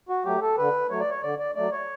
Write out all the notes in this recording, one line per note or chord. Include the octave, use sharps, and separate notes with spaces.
F#4
F#3 A3 G4
A4
D3 B4
F#3 A3 C#5
D5
C#5
D3 D5
D5
F#3 A3 D5
C#5